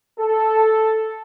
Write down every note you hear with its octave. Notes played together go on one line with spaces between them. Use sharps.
A4